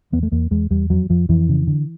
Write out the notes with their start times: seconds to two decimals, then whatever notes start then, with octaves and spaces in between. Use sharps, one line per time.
0.12 E2 B3
0.23 A3
0.32 E2 A#3
0.51 E2 G#3
0.70 E2 G3
0.90 F2 F#3
1.10 F2 F3
1.29 F2 E3
1.49 C#3
1.67 D3